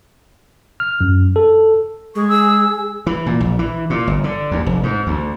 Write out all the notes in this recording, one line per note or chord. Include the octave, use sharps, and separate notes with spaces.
F6
F#2
A4
G#3 C#6
G#4 E6
E3
A#2
A#1
E3
A#2
G1
D3
D#2
F1
G#2
D2